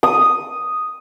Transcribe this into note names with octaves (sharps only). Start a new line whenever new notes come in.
D#6